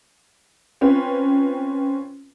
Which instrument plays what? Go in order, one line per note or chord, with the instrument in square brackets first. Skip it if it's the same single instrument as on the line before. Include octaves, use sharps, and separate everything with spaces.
[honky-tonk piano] C4 C#4 F4 B4